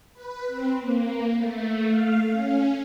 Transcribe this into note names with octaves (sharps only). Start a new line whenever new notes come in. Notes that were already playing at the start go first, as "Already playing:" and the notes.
B4
C4
A#3
A3
F5
C#4